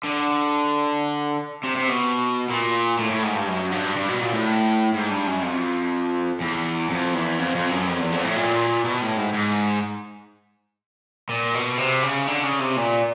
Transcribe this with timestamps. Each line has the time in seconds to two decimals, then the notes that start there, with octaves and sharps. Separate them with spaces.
0.05 D3
1.64 C3
1.76 C3
1.89 B2
2.50 A#2
2.99 A2
3.11 A2
3.23 G#2
3.35 G2
3.47 F#2
3.72 G2
3.96 G2
4.09 B2
4.21 A#2
4.33 A2
4.94 G#2
5.10 G2
5.27 F#2
5.43 F2
6.40 E2
6.90 F2
7.14 E2
7.39 F2
7.55 F2
7.71 F#2
7.87 F2
8.00 E2
8.12 F2
8.24 A2
8.36 A#2
8.85 B2
9.02 A2
9.17 G#2
9.34 G#2
11.29 A#2
11.54 B2
11.78 C3
12.03 C#3
12.28 D3
12.44 C#3
12.60 C3
12.76 A#2